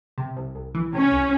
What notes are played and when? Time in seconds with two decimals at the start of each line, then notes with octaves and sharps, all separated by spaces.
0.18 C3
0.36 C2
0.55 C2
0.74 E3
0.93 C3 C#4
1.12 C2